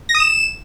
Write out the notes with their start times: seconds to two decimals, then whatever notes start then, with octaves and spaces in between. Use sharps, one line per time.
0.09 A#6
0.15 D#6
0.20 E7